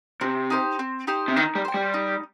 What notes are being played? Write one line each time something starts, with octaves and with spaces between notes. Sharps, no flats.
C3 C4
D#4 G4 C5
C4
D#4 G4 C5
C3
D#3 D#4
G3
C5 G5
G3
D#4